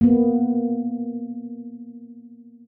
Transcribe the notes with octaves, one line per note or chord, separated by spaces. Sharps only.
A#3 B3